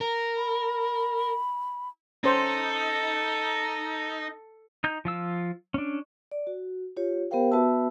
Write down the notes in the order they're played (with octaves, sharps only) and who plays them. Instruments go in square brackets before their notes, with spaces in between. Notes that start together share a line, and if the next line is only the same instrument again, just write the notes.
[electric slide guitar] A#4
[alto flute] B5
[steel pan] C#4 C5 [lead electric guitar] D#4 [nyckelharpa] A4
[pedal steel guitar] D#4 G6
F3 F4 E6
C#4 D4
[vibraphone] D5
F#4
F4 G4 C#5
B3 G4 A#4 C5 F5 G5
B3 F#4 B4 E5 A5 E6